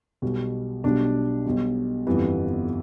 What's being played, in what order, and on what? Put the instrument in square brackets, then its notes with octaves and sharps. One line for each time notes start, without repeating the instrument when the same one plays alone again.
[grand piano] B1 B2 G3
B1 B2 G3 D4
B1 B2 G3
G1 F2 E3 G3 B3